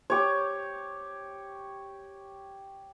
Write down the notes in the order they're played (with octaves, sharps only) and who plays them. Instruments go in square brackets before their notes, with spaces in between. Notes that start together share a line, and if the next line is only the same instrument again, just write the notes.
[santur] G4 C#5